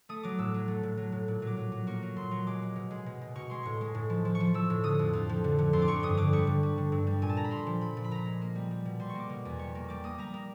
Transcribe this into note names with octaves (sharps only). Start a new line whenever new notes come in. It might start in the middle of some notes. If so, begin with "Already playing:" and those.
A3 D#6
F#3 D6
A2 E6
F#3
A3
A2
F#3
A2
A#2
F#3 D6
F#3
F#3
A#3 C#6
F#3
A#2 C6
F#3 C#6
G#3 D6
G#3
B2
G#3
B2
B2
B2 C#6
G#3 C6
A2 C#6
G#3
A2
F3
F3
C#6
F3
F3 E6
A2
D3 D#6
F2
F2
F3
D3
D3
F2 C6
D6
F2 C#6
G2 D#6
D3 D6
G3 C#6
D3
G3
D3
G2
G3
A#2 G#5
A5
A#2 A#5
B5
A#2 C6
F3
A#2 B5
A#2
B5
A#2 A#5
G#3
A#3
G3
G3
B2
G3 C6
C#6
A#3 D6
B2
E2
G3 C#6
A#3
G3 D6
A#3 D#6
G3 A#5
A#3